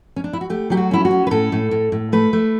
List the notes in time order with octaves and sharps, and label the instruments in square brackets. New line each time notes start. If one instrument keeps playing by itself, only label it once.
[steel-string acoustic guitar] C#4
D4
E4
F#4
A3 G4
F#3 G4
F#4
C#4 E4
F#4
C#4
B4
A2 A4
A2
A2
A2
A3 B4
A3